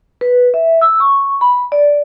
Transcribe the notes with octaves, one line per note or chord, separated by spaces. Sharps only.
B4
E5
E6
C#6
B5
D5